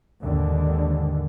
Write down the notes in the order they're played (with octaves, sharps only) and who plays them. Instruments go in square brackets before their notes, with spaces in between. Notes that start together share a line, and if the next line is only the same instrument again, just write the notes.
[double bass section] D#2 G#2 D3